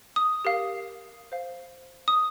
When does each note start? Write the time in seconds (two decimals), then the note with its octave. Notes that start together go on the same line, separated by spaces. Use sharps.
0.16 D#6
0.45 G4 A#4 F5
1.32 C5 F5
2.08 D#6